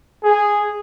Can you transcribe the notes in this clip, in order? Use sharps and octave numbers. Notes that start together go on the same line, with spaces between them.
G#4